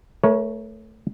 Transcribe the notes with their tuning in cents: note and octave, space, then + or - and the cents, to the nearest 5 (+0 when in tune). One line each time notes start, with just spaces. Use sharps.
A3 +0 A#4 +40 C#5 +0